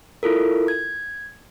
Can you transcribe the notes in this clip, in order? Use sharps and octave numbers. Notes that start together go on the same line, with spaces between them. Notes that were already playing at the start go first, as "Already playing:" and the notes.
E4 F4 A4 A#4
G#6